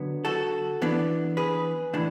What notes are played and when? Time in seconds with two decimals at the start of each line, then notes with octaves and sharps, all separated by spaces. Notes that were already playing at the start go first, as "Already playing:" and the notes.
Already playing: D3 F#3 B3
0.25 F#4 A4
0.82 E3 B3 D4
1.37 G#4 B4
1.93 A2 E3 D4